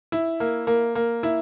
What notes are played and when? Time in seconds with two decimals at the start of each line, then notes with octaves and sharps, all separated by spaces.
0.12 E4
0.40 A#3
0.67 A#3
0.95 A#3
1.23 E4